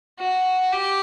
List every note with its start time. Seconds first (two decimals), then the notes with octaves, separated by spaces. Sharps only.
0.19 F#4
0.73 G4